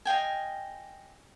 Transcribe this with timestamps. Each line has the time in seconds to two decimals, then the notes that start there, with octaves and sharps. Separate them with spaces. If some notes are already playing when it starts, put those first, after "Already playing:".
0.05 D#5 F5 G5 G#5